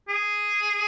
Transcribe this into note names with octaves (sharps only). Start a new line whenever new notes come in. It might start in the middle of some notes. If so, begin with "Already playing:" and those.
G#4